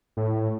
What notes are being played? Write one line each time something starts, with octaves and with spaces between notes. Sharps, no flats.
A2